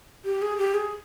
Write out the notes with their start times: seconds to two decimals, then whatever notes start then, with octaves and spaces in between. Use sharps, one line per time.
0.25 G4
0.42 G#4
0.58 G4
0.74 G#4